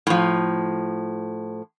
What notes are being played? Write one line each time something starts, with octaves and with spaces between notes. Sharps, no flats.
A2 F3